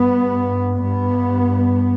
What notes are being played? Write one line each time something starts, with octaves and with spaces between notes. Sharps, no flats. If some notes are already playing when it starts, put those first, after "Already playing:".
Already playing: G2 B3
G2 B3